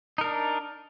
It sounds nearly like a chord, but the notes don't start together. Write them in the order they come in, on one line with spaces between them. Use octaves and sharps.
D#4 A#4 D4